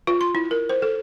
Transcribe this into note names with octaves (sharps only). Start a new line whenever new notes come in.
F4
C6
E4
A#4
C5
A4